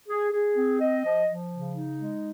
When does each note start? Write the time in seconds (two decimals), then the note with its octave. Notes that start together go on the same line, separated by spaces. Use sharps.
0.08 G#4
0.32 G#4
0.56 C4
0.80 D#5
1.03 F3
1.27 F3
1.51 C#3
1.74 D#4
1.98 G#3